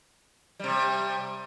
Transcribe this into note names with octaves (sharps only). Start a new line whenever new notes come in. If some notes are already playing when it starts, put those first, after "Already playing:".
C3 G3